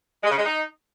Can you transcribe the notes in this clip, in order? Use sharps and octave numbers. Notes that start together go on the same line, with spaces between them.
G#3
C#3
G#3
D#4